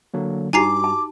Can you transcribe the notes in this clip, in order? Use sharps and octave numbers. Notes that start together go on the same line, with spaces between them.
D3 F#3 A#3
G2 D#4 F#4 G4 G#5 A#5 D6 C7
A5